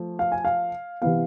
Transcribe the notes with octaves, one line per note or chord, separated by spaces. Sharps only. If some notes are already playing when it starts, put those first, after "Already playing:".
Already playing: F3 A3
F5
G#5
F5
C3 E3 B3 F5